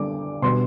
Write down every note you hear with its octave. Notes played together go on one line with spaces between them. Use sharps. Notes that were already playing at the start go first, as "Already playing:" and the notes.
Already playing: D3 G3 D4 D6
B2 G3 B3 D4 C6